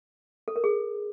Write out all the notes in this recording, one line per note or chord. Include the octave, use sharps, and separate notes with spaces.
A4
A#4
G#4